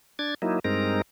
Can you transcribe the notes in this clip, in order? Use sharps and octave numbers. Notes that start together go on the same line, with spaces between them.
D4 G#6 A6
F#3 A#3 D#4 E4
G2 G#3 C4 D#4 A#4 A#5